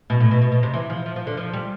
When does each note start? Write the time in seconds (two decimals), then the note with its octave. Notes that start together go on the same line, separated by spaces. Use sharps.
0.10 B2
0.20 A2
0.31 B2
0.42 B2
0.52 B2
0.63 C3
0.74 E3
0.90 F3
1.06 F3
1.16 F3
1.27 D3
1.37 F3
1.53 G3